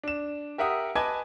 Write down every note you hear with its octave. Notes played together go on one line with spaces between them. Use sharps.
D4 E7
G4 A#4 E5 F#5 D#6
B4 D#5 G#5 A5 D6 G#6